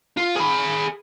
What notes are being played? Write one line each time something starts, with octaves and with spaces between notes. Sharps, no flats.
F4
G#4 B5